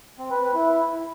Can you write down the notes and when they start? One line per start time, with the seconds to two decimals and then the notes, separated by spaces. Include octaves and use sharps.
0.19 C4
0.31 B4
0.43 B4
0.54 E4